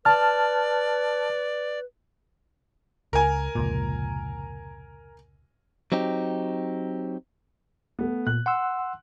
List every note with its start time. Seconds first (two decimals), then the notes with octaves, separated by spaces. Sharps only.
0.05 B4 D5 A5 F6
3.13 C#2 A#4 G#5
3.55 F1 C#2 A#2
5.92 F#3 C4 D#4 G4
7.99 A3 B3
8.27 A#2 F#6
8.46 F#5 C6 E6